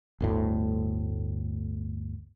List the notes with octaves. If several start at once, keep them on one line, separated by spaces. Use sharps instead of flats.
G1 D2 A2